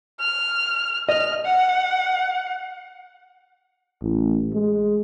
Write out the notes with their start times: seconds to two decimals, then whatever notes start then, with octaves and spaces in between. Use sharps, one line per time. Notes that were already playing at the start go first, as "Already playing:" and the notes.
0.20 F6
1.09 D#5 F6
1.46 F#5
4.02 A1
4.54 G#3